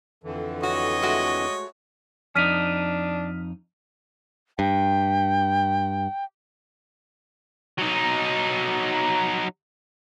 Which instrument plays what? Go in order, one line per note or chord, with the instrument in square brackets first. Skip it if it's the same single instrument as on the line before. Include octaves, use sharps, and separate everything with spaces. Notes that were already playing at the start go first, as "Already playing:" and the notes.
[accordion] F2 D3 E3
[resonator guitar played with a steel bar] F#4 [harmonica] C#5 [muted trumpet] D#5
[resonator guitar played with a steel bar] G#3 A3 F#4
[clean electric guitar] F2 D#4 [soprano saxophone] D4 [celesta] F6 B6 D#7
[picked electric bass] G2 [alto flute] G5
[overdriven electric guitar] F#3 D#4